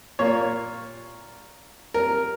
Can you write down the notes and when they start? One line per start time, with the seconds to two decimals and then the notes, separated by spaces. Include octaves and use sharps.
0.19 A#2 A#3 C#5
1.94 A#4